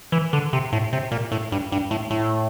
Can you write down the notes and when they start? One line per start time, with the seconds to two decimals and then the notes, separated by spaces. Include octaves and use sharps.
0.12 E3
0.33 D3
0.53 C3
0.72 A2
0.93 C3
1.11 A#2
1.32 A2
1.52 G2
1.72 G2
1.91 A2
2.10 A2